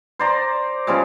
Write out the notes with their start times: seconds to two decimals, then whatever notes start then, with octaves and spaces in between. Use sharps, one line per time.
0.19 C5 D5 A#5
0.87 C#3 F3 G3 G#3